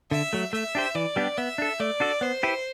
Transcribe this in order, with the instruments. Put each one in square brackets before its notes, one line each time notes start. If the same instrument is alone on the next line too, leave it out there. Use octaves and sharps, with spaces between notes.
[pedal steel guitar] D3 [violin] E5
[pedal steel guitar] F#3 A3
[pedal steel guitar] A3 [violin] E5
[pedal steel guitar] D4 G4 C5
[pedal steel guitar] E3 [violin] D5
[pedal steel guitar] G3 B3 D4 G4
[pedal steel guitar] B3 [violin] E5
[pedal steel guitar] D4 A4
[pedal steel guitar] A3 [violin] D5
[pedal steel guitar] D4 F#4 A4
[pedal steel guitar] B3 [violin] C5
[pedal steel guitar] E4 G4 B4